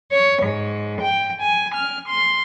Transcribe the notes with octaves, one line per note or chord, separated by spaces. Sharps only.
C#5
G#2
G5
G#5
F6
C6